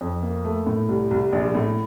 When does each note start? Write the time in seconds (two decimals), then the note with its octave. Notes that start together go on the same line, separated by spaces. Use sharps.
0.01 F2
0.23 A#3
0.45 A3
0.67 A2
0.89 C2
1.11 C2
1.32 A#1
1.55 A2